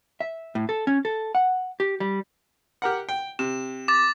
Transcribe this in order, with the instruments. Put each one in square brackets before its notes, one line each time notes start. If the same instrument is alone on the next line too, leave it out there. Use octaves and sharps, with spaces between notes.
[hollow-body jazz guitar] E5
A2
A4
C#4
A4
F#5
G4
G3
[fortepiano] G4 A#4 F#5
G5
[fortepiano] C3 [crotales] E7
[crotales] D6 A6